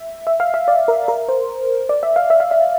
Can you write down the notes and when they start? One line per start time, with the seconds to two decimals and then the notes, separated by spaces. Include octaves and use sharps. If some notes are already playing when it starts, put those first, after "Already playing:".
Already playing: E5
0.27 E5
0.40 F5
0.54 E5
0.68 D5
0.88 A#4
1.08 A#4
1.29 C5
1.89 D5
2.03 E5
2.16 F5
2.30 E5
2.40 F5
2.51 E5